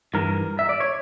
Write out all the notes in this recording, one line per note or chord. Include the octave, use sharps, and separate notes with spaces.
G2 E3 A#4
E5
D5
C#5